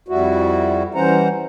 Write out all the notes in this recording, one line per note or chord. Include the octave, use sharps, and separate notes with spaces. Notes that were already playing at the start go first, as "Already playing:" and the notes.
F2 G3 E4 F#4
E3 G3 C#4 C5 F#5 A#5